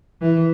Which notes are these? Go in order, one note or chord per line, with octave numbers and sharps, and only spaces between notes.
E3